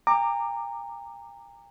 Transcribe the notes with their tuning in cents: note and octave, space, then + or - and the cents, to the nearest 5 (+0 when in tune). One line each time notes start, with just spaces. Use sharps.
G5 +45 A#5 -15 D6 +20